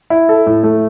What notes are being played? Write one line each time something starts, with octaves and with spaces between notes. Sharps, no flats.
E4
A4
A2
A3